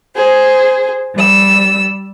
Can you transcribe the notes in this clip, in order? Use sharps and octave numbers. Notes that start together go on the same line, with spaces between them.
G#4 C5
G3 E6